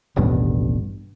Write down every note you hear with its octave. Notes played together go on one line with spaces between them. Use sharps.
D#1 A1 G2 B2